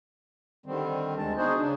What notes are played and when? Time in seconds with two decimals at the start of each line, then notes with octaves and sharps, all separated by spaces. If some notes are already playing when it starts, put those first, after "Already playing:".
0.66 D3 D#3 G3 C4
1.18 D2 G#3 A5
1.37 B3 D4 D#4 F#4 G#4 C5
1.60 C#3 D4